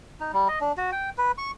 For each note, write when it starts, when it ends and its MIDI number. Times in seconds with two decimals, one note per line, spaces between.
0.20 0.31 63
0.33 0.48 55
0.48 0.59 75
0.61 0.72 62
0.78 0.91 66
0.92 1.10 79
1.18 1.32 71
1.38 1.51 85